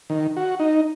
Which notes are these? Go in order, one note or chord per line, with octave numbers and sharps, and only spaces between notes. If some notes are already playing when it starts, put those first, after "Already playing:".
D#3
F#4
D#4